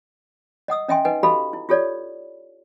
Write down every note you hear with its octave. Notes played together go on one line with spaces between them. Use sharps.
D#5 F#5 D#6 E6
C#4 D#5 E5 G5 G#5 C6
D#4 B4 D#5 F#5 G#5
F#4 G4 A4 D#5 F5 B5
E4
F4 G4 A4 C#5 D5